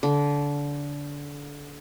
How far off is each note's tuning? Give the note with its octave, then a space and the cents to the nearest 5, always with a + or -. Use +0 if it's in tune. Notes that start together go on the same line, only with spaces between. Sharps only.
D3 -25